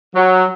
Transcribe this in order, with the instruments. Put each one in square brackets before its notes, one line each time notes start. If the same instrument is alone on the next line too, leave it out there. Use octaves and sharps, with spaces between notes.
[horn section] F#3